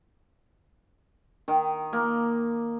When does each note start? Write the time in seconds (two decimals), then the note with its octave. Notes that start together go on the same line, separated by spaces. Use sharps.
1.48 D#3
1.93 A#3